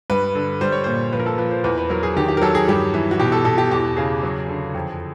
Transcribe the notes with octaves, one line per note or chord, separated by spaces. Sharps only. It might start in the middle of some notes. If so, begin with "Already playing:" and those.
G2 B4
D3
G3 C5
C#5
A#2 C5
F3 B4
A#4
A4
F3 B4
C5
E2 B4
B4
F#3 A#4
G#4
D#3 G4
G4
A#4
F#3 A4
G#4
G2 G4
E3
F#4
B2 G4
A4
B2 A4
G4
E2 G4
C#3 G#4
F#3
D3
F2